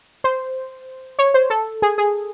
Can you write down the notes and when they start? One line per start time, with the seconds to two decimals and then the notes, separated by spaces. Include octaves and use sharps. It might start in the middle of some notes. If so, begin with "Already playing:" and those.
0.24 C5
1.19 C#5
1.34 C5
1.50 A4
1.82 G#4
1.98 G#4